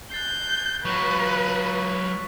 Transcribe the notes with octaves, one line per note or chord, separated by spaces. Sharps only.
F#6 G6 A6 C7
F#3 F4 B4 C#6 B6